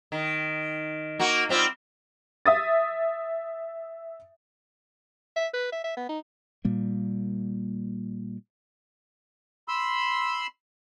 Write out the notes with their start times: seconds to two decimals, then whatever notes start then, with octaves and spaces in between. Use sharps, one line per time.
0.12 D#3
1.19 A#3 F#4
1.49 G3 C4 F4
2.46 E5 D#6 A6
5.36 E5
5.54 B4
5.72 E5
5.84 E5
5.97 B3
6.09 D#4
6.65 A#2 G3 A#3
9.68 B5 C6 E6